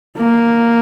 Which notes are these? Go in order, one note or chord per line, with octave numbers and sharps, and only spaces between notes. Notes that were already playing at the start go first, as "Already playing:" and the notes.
A#3